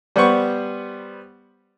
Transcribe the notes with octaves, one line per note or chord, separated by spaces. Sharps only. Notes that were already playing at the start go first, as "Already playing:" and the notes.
G3 B3 C5 F#5 C#6